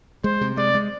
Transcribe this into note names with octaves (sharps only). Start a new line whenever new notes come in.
G#3 C5
C3
G#3 D5
G#3